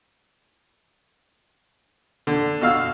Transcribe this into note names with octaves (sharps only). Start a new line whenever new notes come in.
D3
B2 F#4 F5 E6